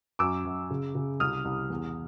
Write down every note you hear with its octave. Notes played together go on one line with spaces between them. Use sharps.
F#2 D6 E6
F#2
C#3
C#3
C2 D#6 F6
C2
E2